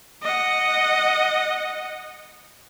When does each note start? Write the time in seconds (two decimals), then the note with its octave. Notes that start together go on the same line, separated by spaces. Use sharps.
0.23 D#5 F#5